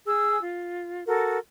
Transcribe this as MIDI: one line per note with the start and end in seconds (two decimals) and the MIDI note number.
0.06 0.39 68
0.06 0.39 80
0.06 0.39 88
0.41 1.02 65
1.06 1.38 66
1.06 1.38 69
1.06 1.38 70